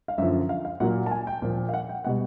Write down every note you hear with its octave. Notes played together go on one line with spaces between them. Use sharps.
F5
F#2 D3 F3 E5
F5
F5
A#2 F#3 A#3 F#5
A5
G#5
G5
A#2 F3 A#3
F5
F#5
G5
B2 G3 F#5